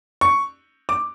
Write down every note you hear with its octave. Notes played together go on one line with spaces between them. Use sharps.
C#6
D6